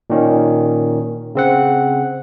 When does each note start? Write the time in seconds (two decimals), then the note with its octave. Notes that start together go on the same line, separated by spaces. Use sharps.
0.10 A#2 D#3 C#4
1.35 C#3 C4 F#5